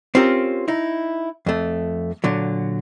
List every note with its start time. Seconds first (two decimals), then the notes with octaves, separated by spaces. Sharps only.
0.15 C4 C#4 F4 G4 A#4
0.68 D#4 E4
1.46 F2 A3
2.24 A#2 D3 F#3